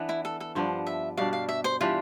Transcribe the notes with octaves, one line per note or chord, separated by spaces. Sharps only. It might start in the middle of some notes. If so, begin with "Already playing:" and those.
Already playing: E3 B3 D4
E4
A4
A4
G2 F3 B3 D4 C5
E5
B2 G3 D4 F5
F5
E5
C5
E3 G3 D4 F4 G4